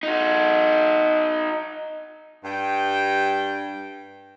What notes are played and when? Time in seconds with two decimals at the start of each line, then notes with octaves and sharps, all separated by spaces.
0.03 D#4 F#4
2.45 G2 G5